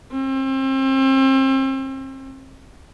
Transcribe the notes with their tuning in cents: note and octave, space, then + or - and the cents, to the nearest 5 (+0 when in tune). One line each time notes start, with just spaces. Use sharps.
C4 +35